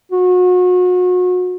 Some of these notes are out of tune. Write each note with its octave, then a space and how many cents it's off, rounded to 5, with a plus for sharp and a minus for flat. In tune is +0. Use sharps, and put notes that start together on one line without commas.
F#4 -35